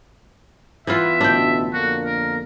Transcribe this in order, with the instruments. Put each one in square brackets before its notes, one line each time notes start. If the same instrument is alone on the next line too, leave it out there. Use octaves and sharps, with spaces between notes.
[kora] E3 B3 F4 [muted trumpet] E5
[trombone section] A1 D2 B2 [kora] D4 G5
[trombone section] F2 D3 A#3 [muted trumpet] F#4
[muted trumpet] A#4